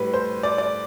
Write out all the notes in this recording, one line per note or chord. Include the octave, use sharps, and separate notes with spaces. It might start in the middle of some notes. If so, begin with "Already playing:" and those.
Already playing: A2 G3 B4
C5
D5
D5